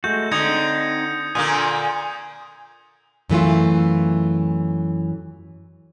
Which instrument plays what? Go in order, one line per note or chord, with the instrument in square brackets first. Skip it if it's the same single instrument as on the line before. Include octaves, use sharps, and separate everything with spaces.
[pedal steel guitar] G#3 A3 F#4 [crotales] G6
[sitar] D3 [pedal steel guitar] C4 D#4 [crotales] D#6 G#6 C#7
[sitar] A#2 D3 A#3 [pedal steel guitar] G#5 [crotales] D#6
[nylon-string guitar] F#2 E3 A3 F4